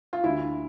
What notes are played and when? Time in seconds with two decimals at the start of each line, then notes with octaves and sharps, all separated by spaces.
0.13 F4
0.24 D2 E4